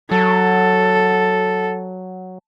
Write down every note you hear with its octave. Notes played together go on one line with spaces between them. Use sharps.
F#3 A4